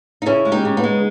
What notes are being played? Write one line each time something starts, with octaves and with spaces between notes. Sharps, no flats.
D#4
C#3 C#4 E4
G#3
D#4 G4
C#3
B3 D#4
G#3